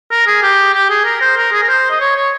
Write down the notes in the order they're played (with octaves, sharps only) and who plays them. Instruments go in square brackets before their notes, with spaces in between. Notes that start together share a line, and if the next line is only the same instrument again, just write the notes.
[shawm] A#4
G#4
G4
G4
G#4
A#4
C5
A#4
G#4
A#4
C5
D#5
C#5
C#5